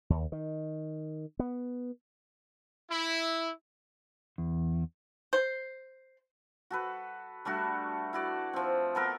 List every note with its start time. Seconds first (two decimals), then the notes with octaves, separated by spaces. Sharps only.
0.10 D#2
0.32 D#3
1.39 B3
2.90 E4
4.38 E2
5.33 C5
6.70 F#4 A4 B4
7.45 G3 A3 D4 F#4
8.13 E4 F#4 D5
8.53 F3 C4
8.95 B3 A4 A#4